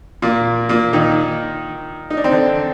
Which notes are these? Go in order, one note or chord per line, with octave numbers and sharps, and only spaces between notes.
A#2 A#3
A#2 A#3
D#3 D#4
D#4
D4
C4
D3 D4